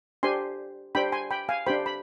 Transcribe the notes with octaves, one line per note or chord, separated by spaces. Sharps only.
D4 G4 C5 G#5 C6
D4 G4 C5 G5 B5
G#5 C6
G5 B5
F5 G#5
D4 G4 C5 G5 B5
B5